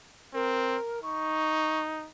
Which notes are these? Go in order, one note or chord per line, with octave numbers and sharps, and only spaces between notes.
C4 A#4
D#4 C#6